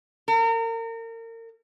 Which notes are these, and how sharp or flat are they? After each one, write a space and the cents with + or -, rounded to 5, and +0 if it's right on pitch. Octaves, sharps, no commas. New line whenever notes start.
A#4 -35